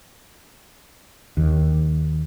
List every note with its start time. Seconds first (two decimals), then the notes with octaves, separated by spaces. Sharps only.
1.37 D#2